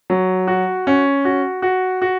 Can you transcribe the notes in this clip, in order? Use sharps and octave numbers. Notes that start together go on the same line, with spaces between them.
F#3
F#4
C#4
F#4
F#4
F#4